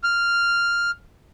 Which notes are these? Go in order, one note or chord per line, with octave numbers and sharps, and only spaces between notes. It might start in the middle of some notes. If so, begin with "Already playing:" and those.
F6